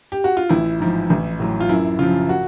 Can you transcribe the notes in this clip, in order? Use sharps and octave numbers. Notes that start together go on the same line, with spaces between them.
G4
F#4
F4
A1 E4
G#2 F3
A1
A2 F#3
F4
F#2 E4
C#3 F3 F4
F#4